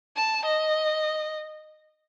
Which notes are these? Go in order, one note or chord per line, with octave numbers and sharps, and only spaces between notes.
A5
D#5